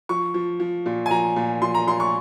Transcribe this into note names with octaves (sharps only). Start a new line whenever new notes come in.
F3 C#6
F3
F3
A#2
G#5
F3 A#5
A#2
F3 C6
A#5
A#2 C6
C#6